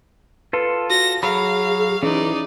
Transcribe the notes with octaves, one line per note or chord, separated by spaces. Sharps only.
F4 A4 B4
F#4 A#6
F#3 G#4 F5 B5
E3 C#4 D#4 D5